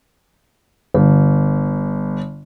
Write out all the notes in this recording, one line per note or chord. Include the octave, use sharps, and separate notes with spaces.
G1